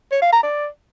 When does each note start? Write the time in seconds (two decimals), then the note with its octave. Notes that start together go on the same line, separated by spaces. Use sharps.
0.11 C#5
0.22 F5
0.33 A#5
0.43 D5